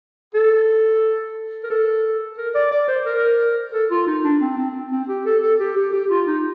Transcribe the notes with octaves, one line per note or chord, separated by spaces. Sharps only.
A4
A#4
A4
A#4
D5
D5
C5
A#4
A4
F4
D#4
D4
C4
C4
C4
G4
A4
A4
G4
G4
G4
F4
D#4